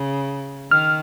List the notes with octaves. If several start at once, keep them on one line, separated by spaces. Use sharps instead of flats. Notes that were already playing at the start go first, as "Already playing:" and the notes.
Already playing: C#3
D#3 F6